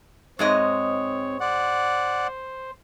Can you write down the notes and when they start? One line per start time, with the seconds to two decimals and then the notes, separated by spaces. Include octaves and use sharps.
0.39 G#2 G#3 C4 C#5 D#5
1.40 C5 D5 F#5